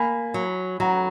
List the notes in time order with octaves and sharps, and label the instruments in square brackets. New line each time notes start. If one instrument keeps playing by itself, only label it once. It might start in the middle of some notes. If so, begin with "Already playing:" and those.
Already playing: [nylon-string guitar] A#3 [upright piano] G#5 B5
[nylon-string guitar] F#3
[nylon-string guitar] F#3 [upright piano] F#5 A#5